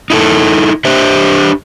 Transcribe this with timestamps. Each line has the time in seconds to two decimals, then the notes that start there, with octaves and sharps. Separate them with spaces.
0.10 D#4 E4 A4
0.85 D4 G4 C5 E5